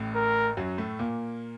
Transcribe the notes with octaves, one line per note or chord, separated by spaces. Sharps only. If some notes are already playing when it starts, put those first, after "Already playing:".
Already playing: A1 A2
A#4
F#2 F#3
A2 A3
A#2 A#3